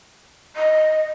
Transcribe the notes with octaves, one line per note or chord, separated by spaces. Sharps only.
D#5